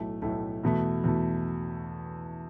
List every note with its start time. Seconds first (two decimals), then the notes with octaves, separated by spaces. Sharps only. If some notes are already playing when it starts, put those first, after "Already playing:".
Already playing: B1 A2 A3
0.22 B1 A2 A3
0.64 E2 B2 A3
1.04 E2 B2 A3